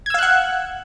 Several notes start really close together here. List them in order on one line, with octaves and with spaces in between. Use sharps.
G#6 E6 F5 F#6 F#5